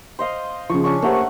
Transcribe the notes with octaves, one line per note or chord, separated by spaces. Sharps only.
C5 D#5 F5
C#3 F3 C#6
C#4 D4 C#6
A3 A#3 G4 A#4 C5 F#5